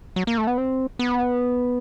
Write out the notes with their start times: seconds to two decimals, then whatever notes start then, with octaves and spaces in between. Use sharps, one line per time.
0.16 F#3
0.27 A#3
0.38 A3
0.47 B3
0.58 C4
0.99 B3